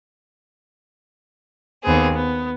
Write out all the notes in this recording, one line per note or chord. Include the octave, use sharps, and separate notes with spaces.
D#2 B3 C4 G#4
B3